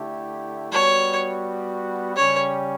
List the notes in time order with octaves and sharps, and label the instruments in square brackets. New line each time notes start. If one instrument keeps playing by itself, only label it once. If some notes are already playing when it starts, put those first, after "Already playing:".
Already playing: [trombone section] D3 A3 E4 G4
[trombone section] G3 B3 F#4 [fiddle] C#5
[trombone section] C#3 G3 C#4 G4 [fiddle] C#5